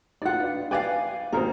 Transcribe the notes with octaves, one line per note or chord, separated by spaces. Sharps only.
D#4 F4 D5 F#5
D4 B4
B4 D5 F5 G5 G#5 D6
G#1 A#3 D#4 A#4 C5